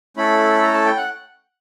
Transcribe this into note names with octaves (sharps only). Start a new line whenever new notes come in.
A3 C#4 E4 A4 B5
A#5
A5
G5
F#5